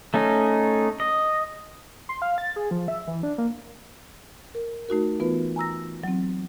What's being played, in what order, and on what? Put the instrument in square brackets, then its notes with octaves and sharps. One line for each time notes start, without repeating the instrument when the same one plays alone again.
[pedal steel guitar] A3 C#4 D#4
D#5
[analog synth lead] C6
F5
A6
G#4
F3
E5
E3
D4
A#3
[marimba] A#4
A3 D#4 F#4 A#4
E3 B3 F4 B4
G#5 A#5 E6 A#6
F#3 C4